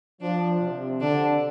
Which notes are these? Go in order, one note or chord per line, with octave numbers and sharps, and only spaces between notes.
F3 D4
C3
D3 D4